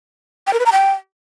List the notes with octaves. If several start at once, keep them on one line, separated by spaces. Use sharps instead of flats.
G5
A#4
B4
A#5
G5